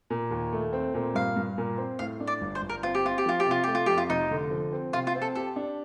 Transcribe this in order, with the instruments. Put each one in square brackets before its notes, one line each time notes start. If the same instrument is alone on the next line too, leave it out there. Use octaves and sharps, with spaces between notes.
[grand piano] A#2
D#2
A3
C4
A#2
[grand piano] G2 [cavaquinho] F5
[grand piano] G2
A#2
C4
[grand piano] A2 [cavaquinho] F5
[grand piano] D4
[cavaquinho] D5
[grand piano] G1
[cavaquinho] C5
[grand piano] G1
[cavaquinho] A#4
[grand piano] C4 [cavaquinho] F4
[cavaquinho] G4
[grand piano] C4 [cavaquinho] F4
[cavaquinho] G4
[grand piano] F3 [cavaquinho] F4
[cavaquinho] G4
[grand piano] C3 [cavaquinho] F4
[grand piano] A3 [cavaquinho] G4
[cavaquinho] F4
[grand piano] F2 [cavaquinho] G4
[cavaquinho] F4
[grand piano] F1 [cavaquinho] D#4
[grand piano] D3
F3
C4
[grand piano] C3 [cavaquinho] F4
[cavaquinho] F4
[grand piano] C4
[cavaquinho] A4
[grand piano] G4 [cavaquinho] A4
[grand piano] D4